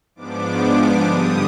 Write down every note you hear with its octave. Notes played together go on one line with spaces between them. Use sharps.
G#2 F3 B3 D4 D6
G2 D3 G3 D#6